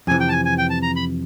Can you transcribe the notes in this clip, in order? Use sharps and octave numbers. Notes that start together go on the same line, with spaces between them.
F2 C3 E3 G#5
G5
A5
G#5
G#5
G5
A5
A#5
B5